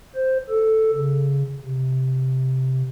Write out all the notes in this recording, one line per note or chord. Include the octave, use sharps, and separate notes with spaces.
C5
A4
C#3
C3